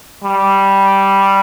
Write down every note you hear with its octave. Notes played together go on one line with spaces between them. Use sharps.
G3